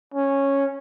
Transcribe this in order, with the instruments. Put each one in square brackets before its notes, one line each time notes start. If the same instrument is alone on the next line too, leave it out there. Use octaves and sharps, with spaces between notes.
[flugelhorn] C#4